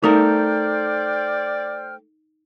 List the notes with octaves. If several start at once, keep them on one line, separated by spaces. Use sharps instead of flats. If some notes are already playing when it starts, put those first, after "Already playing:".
A3 D#4 A#4 C5 D5 G5 F6